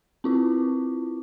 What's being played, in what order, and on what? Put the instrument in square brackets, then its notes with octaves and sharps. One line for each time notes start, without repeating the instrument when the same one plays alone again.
[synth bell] C4 E4 F4